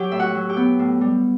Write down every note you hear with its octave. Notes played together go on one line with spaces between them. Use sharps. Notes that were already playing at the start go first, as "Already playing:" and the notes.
Already playing: F#3 G4 G5
A2 E5
F#4 F#5
F#3
G4 G5
B3
A2
G3